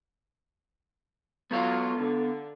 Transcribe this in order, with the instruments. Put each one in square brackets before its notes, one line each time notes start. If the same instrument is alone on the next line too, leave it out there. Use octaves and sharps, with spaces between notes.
[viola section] F#3 F4 [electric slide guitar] B3 A4 F5
[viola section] D3